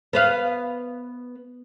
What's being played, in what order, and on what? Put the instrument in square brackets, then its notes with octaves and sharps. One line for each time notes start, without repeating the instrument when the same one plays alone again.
[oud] B3 B4 F5